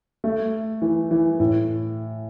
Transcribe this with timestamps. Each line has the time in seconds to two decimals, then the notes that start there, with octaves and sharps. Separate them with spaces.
0.24 A3
0.82 E3
1.11 E3
1.40 A2